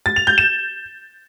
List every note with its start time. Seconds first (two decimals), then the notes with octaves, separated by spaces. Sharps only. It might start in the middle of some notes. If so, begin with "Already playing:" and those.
0.06 A6
0.16 F7
0.27 G6
0.38 E7